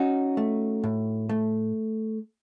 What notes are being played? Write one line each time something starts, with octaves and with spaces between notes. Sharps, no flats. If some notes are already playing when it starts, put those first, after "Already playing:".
Already playing: C#4 D#4 F#4
A3
A2
A3